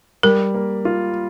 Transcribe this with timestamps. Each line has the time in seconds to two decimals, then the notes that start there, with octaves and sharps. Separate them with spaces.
0.23 G3 A#4
0.54 A#3
0.85 F4